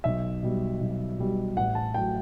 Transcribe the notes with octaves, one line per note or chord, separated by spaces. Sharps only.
B1 E5
B2 G3
B1
B2 G3
A1 F#5
A5
A2 F#3 G5